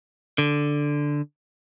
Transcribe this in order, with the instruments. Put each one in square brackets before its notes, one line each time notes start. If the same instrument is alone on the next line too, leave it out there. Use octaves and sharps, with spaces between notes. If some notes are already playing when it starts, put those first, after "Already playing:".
[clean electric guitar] D3